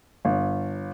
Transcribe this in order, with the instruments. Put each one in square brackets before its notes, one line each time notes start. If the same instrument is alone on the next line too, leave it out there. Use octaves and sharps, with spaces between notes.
[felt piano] G1